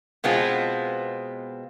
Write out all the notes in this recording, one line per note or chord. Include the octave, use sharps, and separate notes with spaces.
B2 G#3 B3 C4 F4